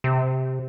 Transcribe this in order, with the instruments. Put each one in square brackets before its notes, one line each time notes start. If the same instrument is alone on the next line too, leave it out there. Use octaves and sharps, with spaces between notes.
[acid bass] C3